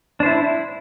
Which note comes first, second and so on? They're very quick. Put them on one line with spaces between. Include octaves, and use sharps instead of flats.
D4 C5 E4